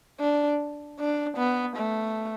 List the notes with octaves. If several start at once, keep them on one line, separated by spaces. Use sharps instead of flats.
D4
D4
B3
A3